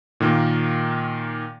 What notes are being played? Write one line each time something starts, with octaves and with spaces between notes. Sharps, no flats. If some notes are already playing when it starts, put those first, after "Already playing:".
A#2 D#3 A#3